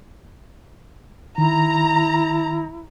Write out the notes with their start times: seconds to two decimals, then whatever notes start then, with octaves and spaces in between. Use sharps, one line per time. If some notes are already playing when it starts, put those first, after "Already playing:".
1.38 D#3 E4 A#5